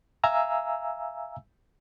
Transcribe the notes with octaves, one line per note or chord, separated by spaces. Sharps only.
E5 F5 G#5 A#5 E6